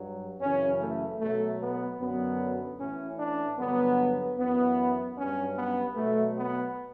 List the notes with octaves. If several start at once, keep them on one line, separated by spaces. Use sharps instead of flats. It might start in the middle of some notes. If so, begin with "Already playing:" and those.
Already playing: G2 F#3
F#2 C#3 E3 C#4
A3
B2 F#3 A3
B3
F#2 D3 F#3 B3
A2 E3 C#4
D4
G2 D3 F#3 B3
F#2 E3 B3
G2 F#3 C#4
B3
B2 F#3 A3
B3